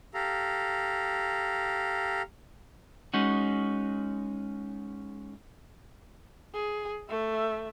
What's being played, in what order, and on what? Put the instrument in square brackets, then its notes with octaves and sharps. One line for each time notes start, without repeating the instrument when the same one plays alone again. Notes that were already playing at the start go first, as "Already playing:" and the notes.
[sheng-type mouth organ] G4 A4 F5 A#5
[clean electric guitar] G#3 C#4 D#4 F#4
[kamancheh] G#4
A3 E5